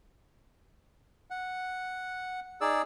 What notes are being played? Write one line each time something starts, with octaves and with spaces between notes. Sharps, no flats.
F#5
D#4 G#4 D5 E6